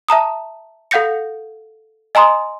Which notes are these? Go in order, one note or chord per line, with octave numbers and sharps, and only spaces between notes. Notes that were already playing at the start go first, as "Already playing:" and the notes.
E5 A5 A#5 D#6
A4 F5 F#5 G6 A#6 C#7
D#5 G#5 A#5 C6 D#6